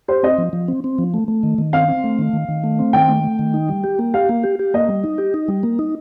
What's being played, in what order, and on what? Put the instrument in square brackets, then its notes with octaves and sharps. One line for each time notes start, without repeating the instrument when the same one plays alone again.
[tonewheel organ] G4 [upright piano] C5
[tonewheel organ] C4 [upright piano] D#5
[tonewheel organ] F3
F3
C4
C4
F3
A3
A3
D#3
D#3
[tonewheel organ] C4 [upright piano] F5
[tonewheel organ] C4
A3
D#3
D#3
D#3
A3
C4
[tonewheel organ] D#3 [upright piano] G5
[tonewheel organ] A3
A3
D#3
D#4
G3
G4
A#3
[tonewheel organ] G4 [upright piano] F5
[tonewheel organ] A#3
G4
G4
[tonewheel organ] A#3 [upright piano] D#5
[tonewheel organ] G3
D#4
G4
D#4
G3
A#3
D#4